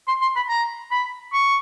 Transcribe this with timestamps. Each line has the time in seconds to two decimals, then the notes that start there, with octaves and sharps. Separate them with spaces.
0.08 C6
0.22 C6
0.36 B5
0.49 A#5
0.91 B5
1.33 C#6